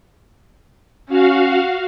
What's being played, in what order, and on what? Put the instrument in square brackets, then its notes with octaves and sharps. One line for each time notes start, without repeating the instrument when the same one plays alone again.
[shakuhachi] C#4 [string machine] F#4 F5